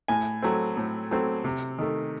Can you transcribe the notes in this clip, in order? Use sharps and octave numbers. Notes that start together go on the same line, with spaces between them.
A2 G#5
F#3 A3 C4
A2
F#3 A3 C4
C3
D#3 A3